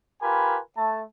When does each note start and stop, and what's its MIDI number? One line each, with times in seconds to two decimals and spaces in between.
0.22 0.59 65
0.22 0.59 67
0.22 0.59 70
0.22 0.59 71
0.22 0.59 80
0.22 0.59 83
0.77 1.02 57
0.77 1.02 81